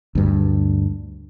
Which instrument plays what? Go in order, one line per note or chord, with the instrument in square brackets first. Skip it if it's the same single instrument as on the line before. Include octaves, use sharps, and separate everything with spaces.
[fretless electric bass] D2 G2